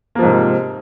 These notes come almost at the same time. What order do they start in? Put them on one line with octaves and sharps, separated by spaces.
A#3 F3 G#2 C3